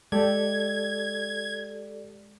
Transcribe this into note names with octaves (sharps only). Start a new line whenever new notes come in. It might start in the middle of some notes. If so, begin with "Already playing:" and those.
G#3 G4 A4 D5 G#6